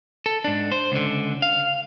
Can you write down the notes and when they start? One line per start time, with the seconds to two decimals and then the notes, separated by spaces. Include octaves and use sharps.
0.26 A4
0.44 G#2 D4
0.72 C5
0.92 C#2 D3
1.42 F5